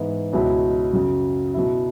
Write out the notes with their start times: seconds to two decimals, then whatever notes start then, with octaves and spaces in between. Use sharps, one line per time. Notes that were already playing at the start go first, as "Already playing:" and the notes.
Already playing: G#2 E3 B3
0.33 C#2 B2 F#3 C#4 E4
0.93 F#2 C#3 F#3
1.54 B2 F#3 E4